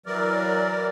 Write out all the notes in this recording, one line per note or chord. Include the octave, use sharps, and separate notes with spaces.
E3 F#3 A#4 D5